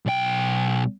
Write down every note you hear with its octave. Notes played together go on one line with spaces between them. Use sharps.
B1 G5